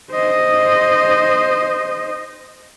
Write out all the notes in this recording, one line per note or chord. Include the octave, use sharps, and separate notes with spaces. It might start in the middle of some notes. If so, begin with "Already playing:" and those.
C5 D#5